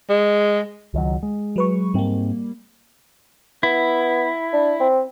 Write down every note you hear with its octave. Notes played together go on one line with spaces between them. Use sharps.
G#3
C#2 D#3 F#3
G#3
F#3 B4 C#6
G#2 G3 A#3 C4
B3 E4
D4
C4